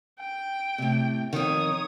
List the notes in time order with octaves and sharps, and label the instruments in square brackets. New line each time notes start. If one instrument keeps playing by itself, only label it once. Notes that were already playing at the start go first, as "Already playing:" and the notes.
[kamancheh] G5
[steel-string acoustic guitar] A2 C3
[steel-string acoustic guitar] F2 D#3 [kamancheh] C#5 D#6